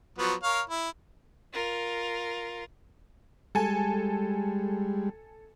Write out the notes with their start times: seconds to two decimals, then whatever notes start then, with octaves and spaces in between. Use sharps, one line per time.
0.18 F3 F#3 B3
0.43 A#4 C#5 F5
0.70 E4
1.53 F4 A#4
3.55 G3 G#3 A4 G#5